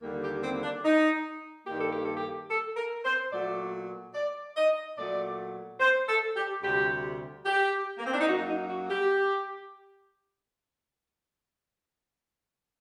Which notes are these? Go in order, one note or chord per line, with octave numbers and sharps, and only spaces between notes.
D#2 D3 G3 A#3
G4
C4
D4
D#4
G2 D#3 G3 A#3 G4
A4
G4
A4
G4
A4
A#4
C5
A#2 F#3 A3 D5
D5
D#5
A#2 F#3 A3 D5
C5
A4
G4
D2 C3 G3 G4
G4
A#3
C4
D4
D#4
F#2 F#3 A#3 F#4
D#4
F#4
G4